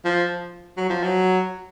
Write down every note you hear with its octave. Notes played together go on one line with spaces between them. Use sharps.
F3
F#3
F3
F#3